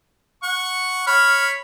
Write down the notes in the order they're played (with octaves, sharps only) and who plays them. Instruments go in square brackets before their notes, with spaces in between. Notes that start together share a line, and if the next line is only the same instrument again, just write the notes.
[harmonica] F#5 C#6
[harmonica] C#5 B5 [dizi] F6